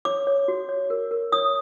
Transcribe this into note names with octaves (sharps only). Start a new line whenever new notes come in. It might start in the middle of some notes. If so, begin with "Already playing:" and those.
C#5 D6
C#5
F#4
C#5
A#4
A#4
C#5 D#6